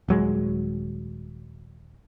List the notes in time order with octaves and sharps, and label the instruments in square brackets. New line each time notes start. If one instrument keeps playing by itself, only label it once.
[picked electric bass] D#1 F#3 G#3